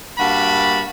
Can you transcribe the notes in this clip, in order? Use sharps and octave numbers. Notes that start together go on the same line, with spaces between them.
G2 A#3 F#4 A5 B5